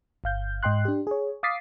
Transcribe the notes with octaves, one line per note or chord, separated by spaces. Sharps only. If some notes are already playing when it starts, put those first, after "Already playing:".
G1 F5 G6
G#2 D#5 G5 C6 F#6
D4 G4
G#4 C#5
F5 D6 D#6 A6 B6 C7